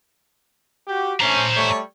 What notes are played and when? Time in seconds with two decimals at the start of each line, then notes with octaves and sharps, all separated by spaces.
0.86 F#4 G4
1.21 A3 C#4 C5 A#5
1.55 G3 A3 C#5